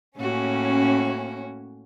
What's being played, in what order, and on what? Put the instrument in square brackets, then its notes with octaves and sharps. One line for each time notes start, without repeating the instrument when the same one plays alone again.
[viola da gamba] A2 A#3 F#4 [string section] C#4